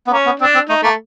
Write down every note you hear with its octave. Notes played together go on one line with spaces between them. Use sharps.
B3
A#3 C#4
B3
C4 D4
C4
A3 D#4
A3 A#3